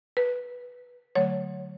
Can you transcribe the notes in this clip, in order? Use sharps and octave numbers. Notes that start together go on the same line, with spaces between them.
B4
D3 F#3 A3 C#5